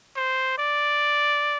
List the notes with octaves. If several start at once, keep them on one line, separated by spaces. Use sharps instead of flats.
C5
D5